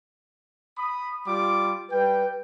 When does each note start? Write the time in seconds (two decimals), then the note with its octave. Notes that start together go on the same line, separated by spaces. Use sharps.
0.78 B5 D#6
1.27 G3 F4 D6
1.92 G3 B4 G5